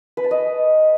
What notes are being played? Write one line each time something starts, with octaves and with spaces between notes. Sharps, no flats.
B4
A5
D#5